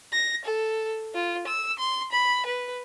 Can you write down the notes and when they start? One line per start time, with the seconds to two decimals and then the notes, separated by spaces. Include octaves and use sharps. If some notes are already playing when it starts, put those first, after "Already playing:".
0.12 A#6
0.45 A4
1.14 F4
1.47 E6
1.78 C6
2.12 B5
2.46 B4